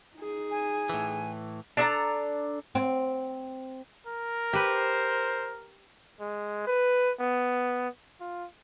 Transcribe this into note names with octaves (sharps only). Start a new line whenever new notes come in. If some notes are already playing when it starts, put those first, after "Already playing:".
D#4 G#4
G#5
A2 E3
D4 A4 A#5
C4
A#4
G4 B4 C5
G#3
B4
B3
F4